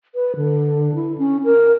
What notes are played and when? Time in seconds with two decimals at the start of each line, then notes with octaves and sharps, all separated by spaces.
0.15 B4
0.36 D3
0.95 E4
1.18 C#4
1.44 A#4